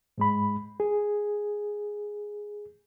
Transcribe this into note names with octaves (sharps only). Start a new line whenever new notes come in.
G#2 G#3 B5
G#4